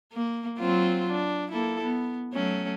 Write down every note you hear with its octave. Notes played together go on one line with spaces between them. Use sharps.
A#3
F#3 C4 F4
D4
A#3 E4 A4
B3
F#3 A3 C#4